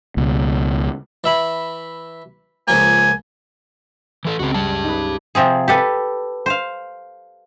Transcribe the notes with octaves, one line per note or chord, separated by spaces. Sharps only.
C#2 B2
E3 E5 B5
C#2 F3 A#3 G#5
E3 A4
C#2 C4 F#4
G3 G4 A5
D#4 B4
C3 F3 C4 G#4
G4 A4 B4
C5 F5